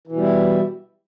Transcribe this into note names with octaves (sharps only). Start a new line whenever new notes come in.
B2 E3 G3 E4